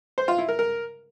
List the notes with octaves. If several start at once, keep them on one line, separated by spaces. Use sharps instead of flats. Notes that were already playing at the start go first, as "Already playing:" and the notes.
C5
F4
E4
A#4
A#4